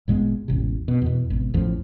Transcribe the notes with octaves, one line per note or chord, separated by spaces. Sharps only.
G#1 A#2 G#3 B3
E1 A1 C3
B2
E2 B2
G#1 B2
A1 E2 A2 F3